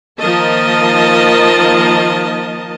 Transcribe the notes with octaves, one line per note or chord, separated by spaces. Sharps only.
D#3 F3 A#3 A#4 D#5 A5